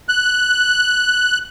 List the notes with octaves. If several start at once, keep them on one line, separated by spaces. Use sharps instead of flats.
F#6